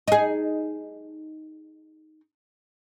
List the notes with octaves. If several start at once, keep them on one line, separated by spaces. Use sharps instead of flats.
D#4 G#4